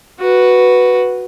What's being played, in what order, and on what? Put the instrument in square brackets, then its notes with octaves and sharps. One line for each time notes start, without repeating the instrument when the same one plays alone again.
[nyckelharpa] F#4 B4